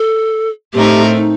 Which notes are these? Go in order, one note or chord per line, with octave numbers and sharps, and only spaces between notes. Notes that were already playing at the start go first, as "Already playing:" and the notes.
Already playing: A4
A2 A3 C4 D#4 G4 A#4
D#4